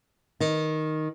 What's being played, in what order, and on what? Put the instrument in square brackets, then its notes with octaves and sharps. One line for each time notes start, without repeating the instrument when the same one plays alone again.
[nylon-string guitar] D#3